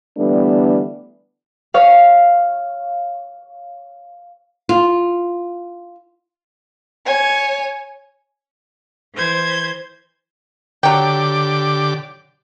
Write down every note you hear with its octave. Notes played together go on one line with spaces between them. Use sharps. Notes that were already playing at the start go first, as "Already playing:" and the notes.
D3 E3 G3 A3 B3 D4
C#5 F5
F4
C#5 G#5
E3 C5 G6 G#6
D3 F#3 G4 G5 D6